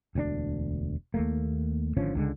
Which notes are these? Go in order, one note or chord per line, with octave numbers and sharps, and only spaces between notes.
E1 D2 C4 D4
D#2 A3 A#3
G#1 D3 F3 C#4
C#2 D3 G#3